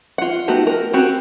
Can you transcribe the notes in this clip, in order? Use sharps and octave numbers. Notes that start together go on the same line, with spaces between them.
F4 F#5
A3 B3 D#4 F#4 G4
A#4
C4 C#4 F#4 G4